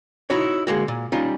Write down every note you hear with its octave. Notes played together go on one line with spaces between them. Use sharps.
D#4 E4 F#4 C#5
D3 G#3 A#3 F#4
A#2
G3 C#4 D#4 F4